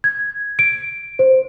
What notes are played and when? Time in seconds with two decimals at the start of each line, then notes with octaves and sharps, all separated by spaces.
0.04 G#6
0.59 D7
1.19 C5